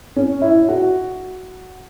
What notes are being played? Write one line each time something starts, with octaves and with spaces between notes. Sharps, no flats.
C#4
E4
F#4